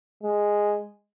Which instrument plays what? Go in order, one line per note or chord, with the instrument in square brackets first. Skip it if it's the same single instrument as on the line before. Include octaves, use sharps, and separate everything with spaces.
[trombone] G#3